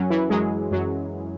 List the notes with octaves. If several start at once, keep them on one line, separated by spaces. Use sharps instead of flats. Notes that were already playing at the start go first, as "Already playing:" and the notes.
Already playing: F#2 F#3 C#4
E3 E4
F#2 F#3 G#3 G#4
F#2 F#3